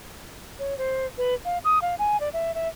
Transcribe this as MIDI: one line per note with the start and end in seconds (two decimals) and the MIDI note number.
0.59 0.77 73
0.78 1.06 72
1.18 1.34 71
1.45 1.58 77
1.65 1.79 87
1.82 1.95 77
1.99 2.19 80
2.20 2.29 74
2.33 2.54 76
2.55 2.68 76